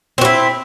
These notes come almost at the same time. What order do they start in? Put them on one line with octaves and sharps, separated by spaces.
C4 F#4 E4